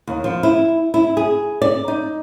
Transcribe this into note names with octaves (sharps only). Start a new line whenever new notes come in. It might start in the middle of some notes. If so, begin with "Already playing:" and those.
D#2
F3
E4
E4
G#4
D5
D#4